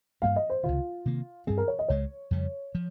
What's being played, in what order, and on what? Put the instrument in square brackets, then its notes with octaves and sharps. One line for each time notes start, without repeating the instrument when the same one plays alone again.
[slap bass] G2 G3 A#3 C#4 [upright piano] F5
[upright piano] D#5
C5
[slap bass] C#2 C3 D#3 [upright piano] F4
[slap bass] C3 D#3 A#3
[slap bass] G2 G3 C4 [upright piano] G#4
[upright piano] A#4
C#5
D#5
[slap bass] C#2 C#3 G#3 [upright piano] C#5
[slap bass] F2 C#3 G3
F3